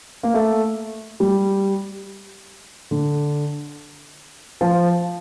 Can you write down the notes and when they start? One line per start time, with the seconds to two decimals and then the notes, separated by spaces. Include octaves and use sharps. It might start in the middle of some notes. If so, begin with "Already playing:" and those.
0.23 A#3
0.34 A3
1.20 G3
2.91 D3
4.61 F3